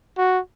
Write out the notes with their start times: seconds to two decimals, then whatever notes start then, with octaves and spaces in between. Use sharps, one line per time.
0.18 F#4